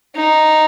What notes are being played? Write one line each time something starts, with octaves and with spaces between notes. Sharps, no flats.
D#4